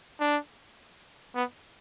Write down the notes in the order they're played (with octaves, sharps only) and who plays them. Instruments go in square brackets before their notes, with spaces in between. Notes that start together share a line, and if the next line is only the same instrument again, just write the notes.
[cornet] D4
B3